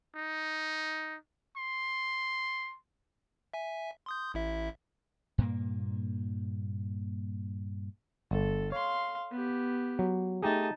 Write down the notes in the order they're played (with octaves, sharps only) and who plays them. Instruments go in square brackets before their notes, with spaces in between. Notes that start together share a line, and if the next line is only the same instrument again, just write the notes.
[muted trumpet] D#4
C6
[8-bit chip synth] E5 G#5
C6 D#6 G6
A1 E4 E5
[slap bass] G2 A#2 A#3
[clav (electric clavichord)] G1 [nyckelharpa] A4
[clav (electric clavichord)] C#5 [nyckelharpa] F5 C6
[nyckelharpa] B3 G4
[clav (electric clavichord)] F#3
[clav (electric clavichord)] A3 G4 G#4 [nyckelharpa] D#4 A5